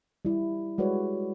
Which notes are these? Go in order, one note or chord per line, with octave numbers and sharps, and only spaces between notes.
G3 E4
G3 G#3 F#4 B4 C#5 D5